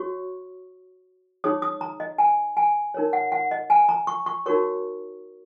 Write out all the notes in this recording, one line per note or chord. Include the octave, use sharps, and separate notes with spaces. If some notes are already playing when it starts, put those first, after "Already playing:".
Already playing: F#4 C#5 C#6
D#4 G#4 C#5 D#6
D#6
A#5
D#5
G#5
G#5
D#4 A#4 C#5
F#5
F#5
D#5
G#5
A#5
C#6
C#6
D#4 F#4 A#4 C#5 C#6